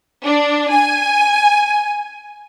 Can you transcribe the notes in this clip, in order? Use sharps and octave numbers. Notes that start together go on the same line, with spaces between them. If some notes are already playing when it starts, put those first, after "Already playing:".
D4
G#5